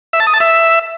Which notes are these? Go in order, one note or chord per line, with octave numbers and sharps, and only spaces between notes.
E5
A5
D#6
A5
E5